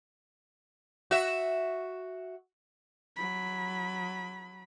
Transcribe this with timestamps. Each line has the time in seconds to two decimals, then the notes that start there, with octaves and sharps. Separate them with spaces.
1.11 F#4 E5
3.16 F#3 B5